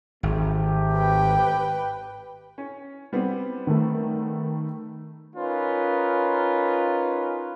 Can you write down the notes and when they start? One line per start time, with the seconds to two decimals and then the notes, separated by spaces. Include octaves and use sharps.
0.23 G#1 C3 A3 G4
0.96 B4 G5
2.58 C#4
3.13 G3 B3 C4
3.67 D#3 A3
5.35 C#4 D#4 F4 A#4 B4